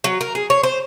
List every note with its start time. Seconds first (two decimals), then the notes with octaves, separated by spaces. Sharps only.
0.04 F#3
0.21 A#4
0.35 G#4
0.50 C#5
0.63 C5